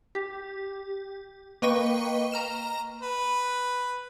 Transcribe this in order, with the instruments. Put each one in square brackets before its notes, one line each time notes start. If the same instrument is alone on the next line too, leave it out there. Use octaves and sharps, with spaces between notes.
[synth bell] G4
A#3 B4 D#5 G5 C#6 D#7
A#5 F6 E7
[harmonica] B4